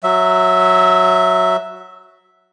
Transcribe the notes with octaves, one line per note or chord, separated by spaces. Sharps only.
F#3 E5